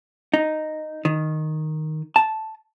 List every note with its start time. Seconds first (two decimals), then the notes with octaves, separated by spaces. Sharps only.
0.33 D#4
1.05 D#3
2.16 A5